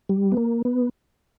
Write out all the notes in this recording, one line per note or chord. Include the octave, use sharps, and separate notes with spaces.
G3
B3
A#3
B3